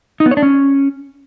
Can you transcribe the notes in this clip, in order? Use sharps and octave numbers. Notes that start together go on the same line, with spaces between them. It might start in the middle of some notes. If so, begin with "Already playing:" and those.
D#4
B3
C#5
D4
C#4